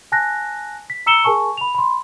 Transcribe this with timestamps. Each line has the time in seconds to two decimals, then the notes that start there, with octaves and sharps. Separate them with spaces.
0.12 G#5 A5 F#6 A#6
0.90 B6
1.06 A#5 E6 C#7 E7 G7
1.24 G#4 A#4 G#5 A5 C#6
1.57 B5 F7
1.75 B5 C6